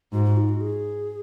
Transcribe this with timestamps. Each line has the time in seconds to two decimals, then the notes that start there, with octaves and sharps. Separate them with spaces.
0.12 G#2 F#4
0.25 F#4
0.37 D#4
0.49 F#4
0.60 G#4